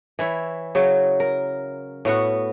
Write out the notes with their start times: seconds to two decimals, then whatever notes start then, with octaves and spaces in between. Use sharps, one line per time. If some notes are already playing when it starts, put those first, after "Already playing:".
0.19 E3 E4 C#5
0.75 C#3 F#3
1.20 A#4
2.05 A2 B3 F#4 F#5